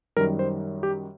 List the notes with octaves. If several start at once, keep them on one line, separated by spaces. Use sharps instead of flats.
F#2 D#3 G3 A#4
C5
G4